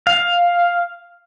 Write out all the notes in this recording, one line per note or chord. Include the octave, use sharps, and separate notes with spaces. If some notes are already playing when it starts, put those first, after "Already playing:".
F5